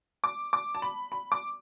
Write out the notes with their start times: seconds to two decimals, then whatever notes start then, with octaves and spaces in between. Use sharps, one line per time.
0.24 D6
0.53 D6
0.75 A5
0.82 B5
1.12 B5
1.32 D6